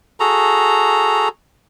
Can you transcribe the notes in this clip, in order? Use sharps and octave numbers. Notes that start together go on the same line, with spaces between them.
F#4 G#4 A4 A#5